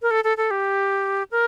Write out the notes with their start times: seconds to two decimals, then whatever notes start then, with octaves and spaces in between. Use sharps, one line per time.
0.02 A#4
0.11 A4
0.24 A4
0.37 A4
0.51 G4
1.31 A#4